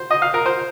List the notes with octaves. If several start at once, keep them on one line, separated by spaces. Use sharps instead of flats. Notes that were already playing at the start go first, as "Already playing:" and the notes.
Already playing: C5
D#5
F5
A#4
C5